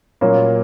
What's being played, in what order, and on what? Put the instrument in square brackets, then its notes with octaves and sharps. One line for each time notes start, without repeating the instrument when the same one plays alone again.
[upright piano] A#2 F#3 A#3 C#4